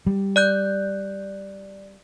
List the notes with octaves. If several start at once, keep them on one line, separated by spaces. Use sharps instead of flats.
G3
D5 F#6 G6